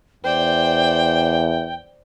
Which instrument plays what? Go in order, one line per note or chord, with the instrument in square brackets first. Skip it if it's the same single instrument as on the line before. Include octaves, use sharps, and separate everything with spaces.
[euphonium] E2 [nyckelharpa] C5 D5 [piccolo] G5